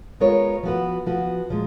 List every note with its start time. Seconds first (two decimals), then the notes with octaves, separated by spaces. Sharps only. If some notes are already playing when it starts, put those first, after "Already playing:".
0.20 G#3 B3 F4 A#4 C#5
0.63 F3 B3 F#4 B4
1.07 F3 B3 F#4 B4
1.49 A#2 F3 G#3